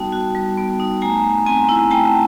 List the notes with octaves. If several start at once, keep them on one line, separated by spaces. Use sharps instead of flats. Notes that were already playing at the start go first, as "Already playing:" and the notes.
Already playing: G3 B3 D#4 F#4 G5 A5
F#4
G3
B3
D#4
A3 G#5 A#5
A3
C4 G#5 A#5
E4
A3 G5 A5